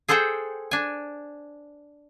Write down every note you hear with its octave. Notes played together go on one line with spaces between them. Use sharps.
G#4 A4 C5 F#5 G5
D4 G#5